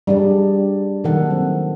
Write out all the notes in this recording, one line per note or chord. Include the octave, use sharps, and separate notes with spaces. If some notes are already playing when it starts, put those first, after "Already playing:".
G3 D4 G#4 D5
A#2 D#3 F#3 A4 F#5
C4